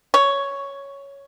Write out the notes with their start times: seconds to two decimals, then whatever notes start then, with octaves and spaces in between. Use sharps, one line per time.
0.14 C#5